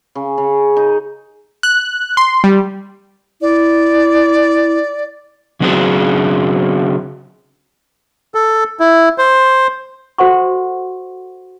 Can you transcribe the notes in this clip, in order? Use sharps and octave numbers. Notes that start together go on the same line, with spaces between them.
C#3
C#3
D#4
F#6
C6
G3
E4 D5
C#3 F#3 C4 D4 F#4 G#4
A4
E4
C5
F#4 A4 C5 F#5 C6 C#6